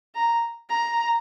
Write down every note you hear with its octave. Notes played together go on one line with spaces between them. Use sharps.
A#5
A#5